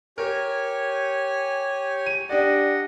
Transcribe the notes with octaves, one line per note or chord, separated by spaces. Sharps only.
G4 A#4 C#5 G#5
D#7
D4 G4 D5 D#5 F#5